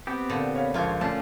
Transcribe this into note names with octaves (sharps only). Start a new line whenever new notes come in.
B3 C4 G4
A#2 D3
C#5 F5
C#2 F3 A#3 F4 C#5 F5
A3 C#4 D4 F4